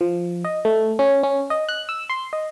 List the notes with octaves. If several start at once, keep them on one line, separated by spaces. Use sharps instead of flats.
F3
D#5
A3
C#4
C#4
D#5
F#6
E6
C6
D#5